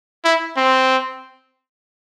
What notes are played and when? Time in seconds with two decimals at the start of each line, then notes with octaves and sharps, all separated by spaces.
0.25 E4
0.57 C4